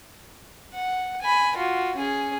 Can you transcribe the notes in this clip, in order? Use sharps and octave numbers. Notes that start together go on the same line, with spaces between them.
F#5
G#5 B5
F4 F#4
C#4 G#4